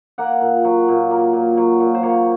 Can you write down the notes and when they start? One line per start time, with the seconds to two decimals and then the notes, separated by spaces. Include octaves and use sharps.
0.18 A#3 F#5
0.41 A#2
0.64 F#3
0.88 A#2
1.11 A#3
1.33 A#2
1.57 F#3
1.80 A#2
1.94 C5
2.03 A#3 C#5